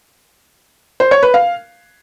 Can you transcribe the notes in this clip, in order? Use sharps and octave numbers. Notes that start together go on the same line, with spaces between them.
C5
C#5
B4
F5